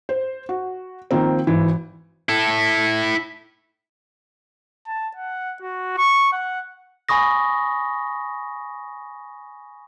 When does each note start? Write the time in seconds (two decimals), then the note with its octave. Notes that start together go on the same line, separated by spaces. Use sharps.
0.09 C5
0.49 F#4
1.11 D#3 F3 A#3 C4
1.47 G#1 E3
2.29 E4 A4
4.87 A5
5.16 F#5
5.61 F#4
5.98 C#6
6.32 F#5
7.09 G#5 B5 C#6 D#6 A#6